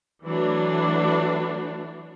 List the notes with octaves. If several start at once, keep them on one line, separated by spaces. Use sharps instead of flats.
E3 F#3 A3 D4